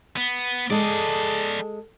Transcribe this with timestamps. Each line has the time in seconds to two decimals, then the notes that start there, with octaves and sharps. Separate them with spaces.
0.17 B3
0.70 G#3 G#4 A4 D5